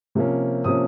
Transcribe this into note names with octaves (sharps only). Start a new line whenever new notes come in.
C3 F3 A#3 C#4
C3 F3 A#3 C#4 D#6